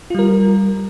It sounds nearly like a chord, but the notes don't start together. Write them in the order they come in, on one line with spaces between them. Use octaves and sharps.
F4 G3 A#4